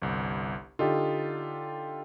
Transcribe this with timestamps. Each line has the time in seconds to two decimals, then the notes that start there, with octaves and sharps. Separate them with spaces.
0.02 G1 C2
0.79 D3 D#4 F4 G4 A4